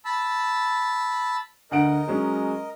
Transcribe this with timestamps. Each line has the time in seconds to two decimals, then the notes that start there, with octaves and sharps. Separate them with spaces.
0.05 A5 B5 E6
1.71 D2 A#4 D#5 F#5 D7
2.07 F#3 G#3 C#4